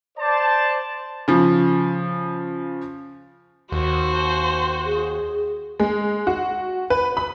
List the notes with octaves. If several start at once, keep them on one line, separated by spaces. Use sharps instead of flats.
C5 D5 A5
C#3 F3
D#2 F#4 C5
G#4
G#3
F#4
B4
B5